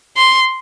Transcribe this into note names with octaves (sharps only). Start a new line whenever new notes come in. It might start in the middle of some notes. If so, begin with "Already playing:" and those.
C6